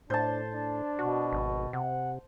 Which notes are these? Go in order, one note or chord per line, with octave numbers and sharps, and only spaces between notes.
A2 D4 C5 A5
D4
B2 F#4
G#1
C3 F#5